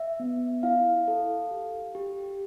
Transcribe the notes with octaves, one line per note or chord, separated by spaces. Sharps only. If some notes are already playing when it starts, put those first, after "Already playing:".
Already playing: E5
B3
E4 F5
A4
G4
G4